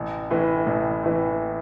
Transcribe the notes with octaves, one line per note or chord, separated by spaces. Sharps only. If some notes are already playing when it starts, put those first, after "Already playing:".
Already playing: A1
A2 E3
A1
A2 E3